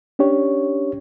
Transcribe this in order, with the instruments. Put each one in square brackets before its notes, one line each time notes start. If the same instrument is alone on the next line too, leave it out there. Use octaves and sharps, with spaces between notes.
[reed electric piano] C#4 D4 G4 C#5